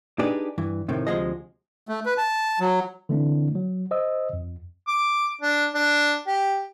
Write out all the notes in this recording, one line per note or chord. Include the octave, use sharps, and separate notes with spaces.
D4 D#4 G4 G#4 B4 D5
G2 E3
A2 C3 D#3 C4
D2 C3 F3 G#3 G#4 D#5
A3
B4
A5
F#3
D3 E3 A3 C4 D4 E4
F#3
C5 D#5 D#6 E6
F2
D6
D4
D4
G4